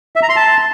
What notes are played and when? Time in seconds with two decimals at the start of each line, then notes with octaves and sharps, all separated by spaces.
0.16 E5
0.23 A#5
0.29 C6
0.36 A5